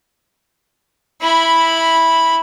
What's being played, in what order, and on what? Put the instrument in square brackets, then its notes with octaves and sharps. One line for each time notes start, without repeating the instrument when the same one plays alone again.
[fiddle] E4 B5